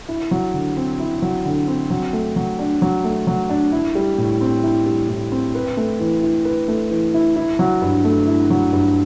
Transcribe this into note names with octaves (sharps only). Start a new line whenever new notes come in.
E4
F#3
D3
C4
E4
F#3
D3
C4
F#3
A3
F#3
D4
F#3
A3
F#3
D4
E4
G3
A2
C4
E4
G3
A2
C4
B4
A3
E3
E4
B4
A3
E3
E4
E4
F#3
G2
A3
E4
F#3
G2